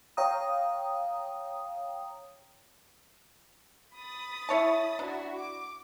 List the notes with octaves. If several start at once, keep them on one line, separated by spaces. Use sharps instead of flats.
C#5 F5 G5 A#5 D#6
B5 D#6 A6
E4 C#5 A5
D4 E4 F#4
D6